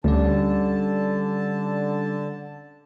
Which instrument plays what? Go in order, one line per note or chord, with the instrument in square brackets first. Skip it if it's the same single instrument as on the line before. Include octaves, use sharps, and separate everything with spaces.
[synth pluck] D2 [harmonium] D3 A5 [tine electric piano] G3 C#4 D5